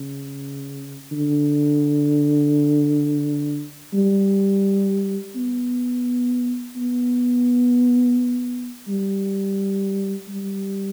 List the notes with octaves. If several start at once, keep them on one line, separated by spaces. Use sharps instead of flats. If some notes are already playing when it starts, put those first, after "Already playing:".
Already playing: C#3
D3
G3
B3
B3
G3
G3